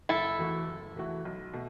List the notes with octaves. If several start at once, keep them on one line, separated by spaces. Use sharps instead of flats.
F#1 E4 A4
E2 E3 A3 F#4
F#1
E2 E3 A3 F#4
B1
B2 A3